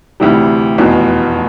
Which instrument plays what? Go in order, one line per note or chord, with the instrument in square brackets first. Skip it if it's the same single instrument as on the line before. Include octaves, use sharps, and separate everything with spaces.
[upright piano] D2 C3 E3 G3
F1 E2 B2